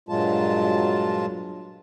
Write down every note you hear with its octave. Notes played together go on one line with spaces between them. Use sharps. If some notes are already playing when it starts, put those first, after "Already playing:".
G2 A#2 F#3 G#3 F4 A5